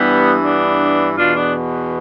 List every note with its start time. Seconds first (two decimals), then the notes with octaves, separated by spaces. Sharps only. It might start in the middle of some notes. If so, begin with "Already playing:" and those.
Already playing: G2 E3 G3 B3
0.41 B3 D4
1.16 E2 B2 D4 F4
1.35 B3 D4